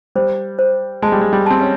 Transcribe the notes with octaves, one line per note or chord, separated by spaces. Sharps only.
G3 C5
C5
G#3 A5
G3
G#3
G3
C4 A5
C#4